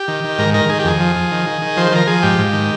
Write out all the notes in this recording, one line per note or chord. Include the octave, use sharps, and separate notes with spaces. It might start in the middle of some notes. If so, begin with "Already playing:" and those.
Already playing: G4
D#3
D#3
G#2 A#4
D#3 A#4
D#3 G#4
G4
F2 G#4
F3
F3
D#3
D#3
D#3
F3 C5
F3 A#4
F3 G#4
G#2 G4
G#2
D#3